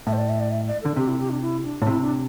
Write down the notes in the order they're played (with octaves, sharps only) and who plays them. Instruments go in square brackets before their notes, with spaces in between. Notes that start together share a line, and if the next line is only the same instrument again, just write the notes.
[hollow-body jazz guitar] A2 [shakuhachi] E5
[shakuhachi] C5
D5
E5
D5
E5
D5
[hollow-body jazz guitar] D3 [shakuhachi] A4
[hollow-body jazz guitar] C3 [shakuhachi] G4
[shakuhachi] E4
G4
D4
E4
D4
[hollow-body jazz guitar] A2
[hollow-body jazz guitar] C3 [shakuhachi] E4
[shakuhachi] D4